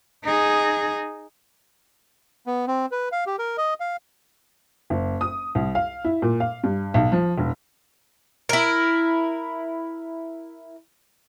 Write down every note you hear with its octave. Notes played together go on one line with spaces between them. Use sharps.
D#4 G#4
B3
C4
B4
F5
G4
A#4
D#5
F5
F#1
D#6
C2
F5
E4
A#2
F5
G2
B1
F3
E1
E4 A#4